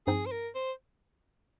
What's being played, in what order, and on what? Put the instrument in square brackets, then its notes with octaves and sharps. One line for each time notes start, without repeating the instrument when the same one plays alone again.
[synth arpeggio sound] G2 F3 C4 D#4 [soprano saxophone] G#4
[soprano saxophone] C5
A#4
C5